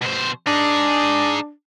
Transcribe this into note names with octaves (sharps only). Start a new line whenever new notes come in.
B2 C5
D4 D#4 G#4